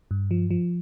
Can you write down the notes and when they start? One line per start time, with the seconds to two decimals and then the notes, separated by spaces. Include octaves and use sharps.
0.11 G2
0.31 F3
0.50 F3